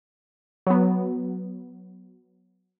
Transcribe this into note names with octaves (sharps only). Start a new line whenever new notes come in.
F#3 B3